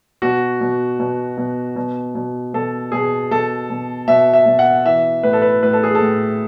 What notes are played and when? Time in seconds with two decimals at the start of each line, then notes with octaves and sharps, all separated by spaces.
0.22 B2 F#4
0.61 B2
1.00 B2
1.38 B2
1.76 B2
2.15 B2
2.54 B2 A4
2.92 B2 G#4
3.31 B2 A4
3.70 B2
4.08 B2 E5
4.34 E5
4.46 B2
4.59 F#5
4.85 E3 E5
5.23 A2 B4
5.33 A4
5.42 B4
5.62 A2 B4
5.73 A4
5.83 G#4
5.95 A4
6.01 A2